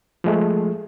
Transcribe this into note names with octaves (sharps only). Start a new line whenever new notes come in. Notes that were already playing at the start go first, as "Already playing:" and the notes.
F3 G#3 A3